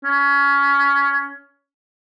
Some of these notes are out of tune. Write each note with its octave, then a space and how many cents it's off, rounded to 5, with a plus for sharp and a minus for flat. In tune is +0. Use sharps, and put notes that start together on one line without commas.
C#4 +20